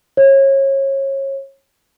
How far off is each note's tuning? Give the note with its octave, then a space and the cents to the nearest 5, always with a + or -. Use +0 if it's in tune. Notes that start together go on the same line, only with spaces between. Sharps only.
C#5 -30